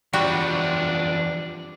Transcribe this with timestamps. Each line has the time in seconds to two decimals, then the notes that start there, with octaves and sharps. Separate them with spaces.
0.13 E2 F3 G3 D4 F#4